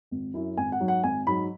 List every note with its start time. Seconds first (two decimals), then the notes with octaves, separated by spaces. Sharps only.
0.11 G#1
0.34 F#2 F#3 C#4 E4
0.57 G#1 G#5
0.72 F#5
0.80 G#2 F#3
0.88 F#5
1.03 G#1 G#5
1.27 G#2 F#3 B5